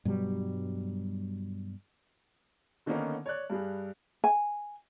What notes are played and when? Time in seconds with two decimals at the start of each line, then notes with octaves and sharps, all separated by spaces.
0.05 G2 B2 F#3 G3
2.86 D3 D#3 A#3 B3 C#4 D#4
3.26 C#5 D5 F#6
3.50 G2 G3 G#4
4.24 G#5